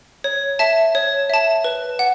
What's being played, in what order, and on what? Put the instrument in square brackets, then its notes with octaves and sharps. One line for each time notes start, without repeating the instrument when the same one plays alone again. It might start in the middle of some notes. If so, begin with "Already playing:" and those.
[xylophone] C#5
E5 A5
C#5
E5 A5
B4
F#5